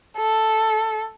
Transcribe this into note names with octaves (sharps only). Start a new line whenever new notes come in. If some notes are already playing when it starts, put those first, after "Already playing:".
A4